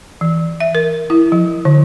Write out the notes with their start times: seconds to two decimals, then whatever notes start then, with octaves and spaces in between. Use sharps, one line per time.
0.21 E3
0.61 E5
0.75 A#4
1.10 E4
1.32 F3
1.65 D3